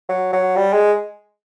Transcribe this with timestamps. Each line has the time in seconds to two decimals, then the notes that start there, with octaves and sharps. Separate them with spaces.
0.09 F#3
0.33 F#3
0.56 G3
0.73 G#3